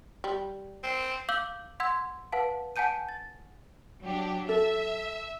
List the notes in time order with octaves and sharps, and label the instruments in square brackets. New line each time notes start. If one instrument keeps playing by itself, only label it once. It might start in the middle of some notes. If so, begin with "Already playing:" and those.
[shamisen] G3
[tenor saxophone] C4
[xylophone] F5 D6 E6 G6 F#7
F#5 C6 E6 G#6
B4 F5 F#5 A5
F#5 G#5 A5 G6 D#7
A6
[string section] F#3 D4 G4
[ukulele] A4 [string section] E5